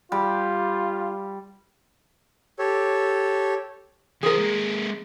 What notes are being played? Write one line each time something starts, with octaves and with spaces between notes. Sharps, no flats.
G3 F4
G4 A4 C#5
E3 G#4 A#4 C5
G#3 A#3